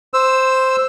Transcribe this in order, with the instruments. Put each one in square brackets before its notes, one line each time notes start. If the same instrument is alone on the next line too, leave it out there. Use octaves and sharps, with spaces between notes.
[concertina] C5 E6